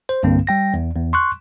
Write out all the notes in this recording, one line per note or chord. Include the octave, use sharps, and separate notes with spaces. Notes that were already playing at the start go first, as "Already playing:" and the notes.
C5
C2 G2 D3 A#3 C4
G3 G5 A#6
E2
E2
C6 C#6 F#6